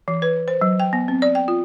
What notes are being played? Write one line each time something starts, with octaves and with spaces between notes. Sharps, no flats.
E3
B4
C5
F#3
G5
B3
C4
D5
G5
F4